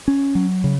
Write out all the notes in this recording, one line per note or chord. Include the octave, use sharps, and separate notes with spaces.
C#4
F#3
C#3